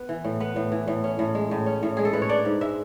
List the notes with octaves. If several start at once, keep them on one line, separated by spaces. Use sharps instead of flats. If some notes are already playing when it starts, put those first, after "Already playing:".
Already playing: B3 B4
E3
A2
B3 B4
A2
E3
A2
C#4
A2
G#3
A2
C#4
A2
G#3 G#4
A4
A2 B4
C#5
D4 D5
G#2
G#3 E5